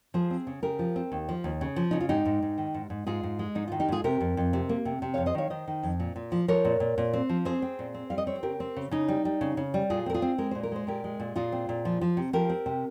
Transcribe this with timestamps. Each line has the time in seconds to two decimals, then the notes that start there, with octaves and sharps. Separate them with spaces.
0.14 F3 G#4 C5
0.30 C4
0.47 C#3
0.63 C#3 G4 A#4
0.79 F3
0.96 C4
1.12 D#2
1.29 F3
1.44 D#2
1.61 C#3
1.76 F3
1.91 C#3 D#4
2.00 F4
2.09 G#2 D#4 G4
2.25 G#2
2.42 G#2
2.58 D#3
2.74 G#2
2.90 G#2
3.07 G#2 F4 G#4
3.23 G#2
3.39 G#3
3.55 G#2 D#4
3.68 F4
3.72 D#3
3.80 D#4 G4
3.89 G#2 F4 G#4
4.04 C3 G4 A#4
4.21 F2
4.37 F2
4.53 C3
4.69 A#3
4.85 C3
5.02 C3
5.14 F2 C#5 F5
5.26 C5 D#5
5.35 D#3 C#5 F5
5.50 D#3 C5 D#5
5.68 D#3
5.83 F2
6.00 A#2
6.16 A#2
6.32 F3
6.48 F3 A#4 C#5
6.65 A#2
6.80 A#2
6.98 A#2
7.13 C4
7.29 F3
7.45 C4 G#4 C5
7.62 C4
7.79 A#2
7.94 C4
8.10 G3 F5
8.18 D#5
8.27 C4 C#5
8.35 C5
8.43 C#3 G4 A#4
8.60 C4
8.76 C#3
8.91 C#3 D#4
9.08 G3
9.25 G3
9.41 C#3
9.57 C#3
9.74 G3
9.90 A#2 F4 G#4
10.06 C4 A#4
10.14 F4 G#4
10.22 C4
10.38 G#3 A#4
10.51 A#2 C5
10.63 A#4
10.71 G#3 C5
10.87 A#2 G4 A#4
11.04 G#3
11.20 A#2
11.36 A#2 F4 G#4
11.52 C4
11.69 A#2
11.85 F3
12.01 F3
12.17 C3
12.33 F3 G4 A#4
12.50 C4
12.66 C3